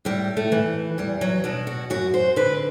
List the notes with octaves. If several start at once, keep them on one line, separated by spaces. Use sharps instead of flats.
A2 G3
A3
E3
E2 G3
F#3
B2 D4
F#4
F#2 F#4
C5
D3 B4